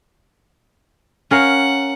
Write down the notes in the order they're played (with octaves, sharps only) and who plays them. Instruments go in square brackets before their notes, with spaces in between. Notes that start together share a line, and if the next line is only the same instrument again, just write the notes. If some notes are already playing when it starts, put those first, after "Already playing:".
[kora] C#4 A#4 F5 [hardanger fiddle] F#5